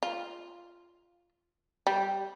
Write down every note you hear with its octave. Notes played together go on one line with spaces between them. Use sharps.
F4
G3